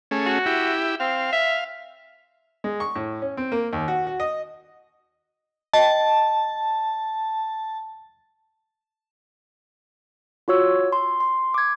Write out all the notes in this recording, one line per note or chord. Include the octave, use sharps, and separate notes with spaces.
A3 C#4 G#4
F#4
E4 G4
C4 F5
E5
G#3
C#6
A2
C#4
C4
A#3
D#2
F#4
F#4
D#5
D#5 G5 A5
F4 F#4 C#5 E6
C6
C6
D6 G#6